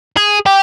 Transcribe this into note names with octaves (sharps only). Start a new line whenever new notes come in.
G#4
G4